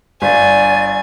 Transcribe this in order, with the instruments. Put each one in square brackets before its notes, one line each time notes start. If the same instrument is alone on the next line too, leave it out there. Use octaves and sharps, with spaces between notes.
[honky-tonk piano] G1 [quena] D5 [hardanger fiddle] G#5